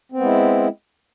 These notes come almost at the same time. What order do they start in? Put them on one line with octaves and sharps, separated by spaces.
C4 B3 G#3 E4